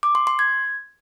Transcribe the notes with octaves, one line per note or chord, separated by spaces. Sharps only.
D6
C6
C6
G#6